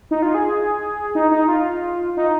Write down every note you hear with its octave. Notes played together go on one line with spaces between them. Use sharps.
D#4
F4
G#4
D#4
D#4
F4
D#4